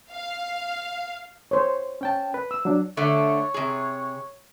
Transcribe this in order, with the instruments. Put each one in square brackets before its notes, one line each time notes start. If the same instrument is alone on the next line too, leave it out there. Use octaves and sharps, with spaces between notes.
[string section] F5
[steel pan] C5 C#5
[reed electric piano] C#4 G5 A5
B4
[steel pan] E6
[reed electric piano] F#3 D4
[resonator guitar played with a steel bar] D3 A3 [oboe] C#5
[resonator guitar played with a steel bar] C3 G#4